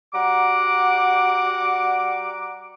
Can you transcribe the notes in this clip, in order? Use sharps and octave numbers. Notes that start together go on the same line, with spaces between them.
G3 F#4 F#5 A#5 D6